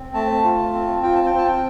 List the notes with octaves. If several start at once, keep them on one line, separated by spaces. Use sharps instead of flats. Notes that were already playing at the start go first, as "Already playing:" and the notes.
Already playing: C4
A3 A5
F4
C4
F4 G5
A5
G5
C4
A5
G5